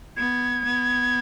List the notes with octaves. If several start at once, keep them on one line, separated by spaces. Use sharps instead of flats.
B3 G#6
B3